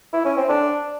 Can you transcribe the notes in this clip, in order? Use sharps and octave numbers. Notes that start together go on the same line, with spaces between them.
E4
C#4
C4
D4